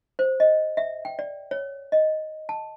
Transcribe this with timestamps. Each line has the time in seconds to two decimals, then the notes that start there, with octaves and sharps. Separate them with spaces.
0.19 C5
0.40 D#5
0.77 E5
1.05 G5
1.19 D5
1.51 C#5
1.92 D#5
2.49 A5